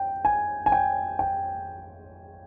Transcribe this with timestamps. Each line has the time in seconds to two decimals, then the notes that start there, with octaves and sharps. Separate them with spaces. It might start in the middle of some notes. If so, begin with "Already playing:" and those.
Already playing: G5
0.25 G#5
0.66 G#5
0.72 G5
1.19 G5